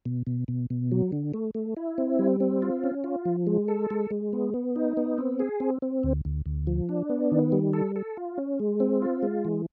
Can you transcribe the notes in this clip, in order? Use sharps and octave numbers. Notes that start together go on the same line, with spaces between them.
B2
B2
B2
B2
F#3
D3
A3
A3
E4
C4
G3
C4
F4
C#4
F4
F3
G#3
A4
G#3
G#3
B3
B3
D#4
B3
C4
G#4
C4
C4
D2
D2
D2
F3
D4
B3
D#3
G3
A4
A4
F4
C#4
G#3
C4
F4
G#3
E3